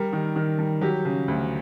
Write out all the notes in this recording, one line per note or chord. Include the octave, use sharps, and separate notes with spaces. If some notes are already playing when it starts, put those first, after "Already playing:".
Already playing: G3 A#4
D#3
D#3
G3
F#3 G4
C#3
D2